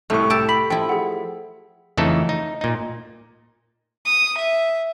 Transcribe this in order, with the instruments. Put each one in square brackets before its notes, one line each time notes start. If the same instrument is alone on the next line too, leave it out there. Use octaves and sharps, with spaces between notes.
[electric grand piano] C2 A2 C#6 [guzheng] A3
[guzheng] G4 A5 [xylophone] E6 D7
[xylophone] B5 F#7 [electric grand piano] B6
[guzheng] F3 E4 [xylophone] G5
[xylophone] G#4 F#5
[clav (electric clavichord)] F2 C#3 E3 A3 D#4 A4
D#4
A#2 D#4
[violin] D#6
E5